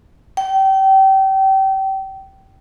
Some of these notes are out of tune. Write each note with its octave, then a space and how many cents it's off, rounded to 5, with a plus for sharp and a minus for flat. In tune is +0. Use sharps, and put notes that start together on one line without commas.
G5 -30